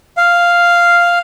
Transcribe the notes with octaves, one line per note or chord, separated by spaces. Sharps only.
F5